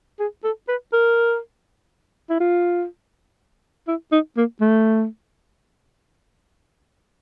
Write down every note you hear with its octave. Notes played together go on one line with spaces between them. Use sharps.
G#4
A4
B4
A#4
E4
F4
E4
D#4
A#3
A3